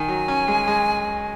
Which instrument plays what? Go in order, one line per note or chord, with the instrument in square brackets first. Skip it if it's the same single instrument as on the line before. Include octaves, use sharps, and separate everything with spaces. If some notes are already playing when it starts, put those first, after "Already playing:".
Already playing: [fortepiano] D#3 [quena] G#5
[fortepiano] F#3
C#4
G#3
G#3